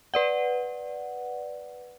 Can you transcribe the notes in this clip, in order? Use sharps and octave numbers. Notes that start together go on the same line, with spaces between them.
B4 D5 F#5